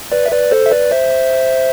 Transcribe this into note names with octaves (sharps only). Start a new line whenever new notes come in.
B4 D5
E5
B4 D5
A4 C5
E5
B4 D5
C5 E5